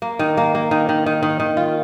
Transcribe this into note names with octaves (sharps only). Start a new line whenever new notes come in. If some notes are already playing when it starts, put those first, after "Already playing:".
A#3
D#3
A#3
A#3
D#3
D#3
D#3
D#3
D#3
F4